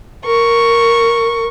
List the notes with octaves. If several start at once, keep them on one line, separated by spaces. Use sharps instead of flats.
A#4 C#6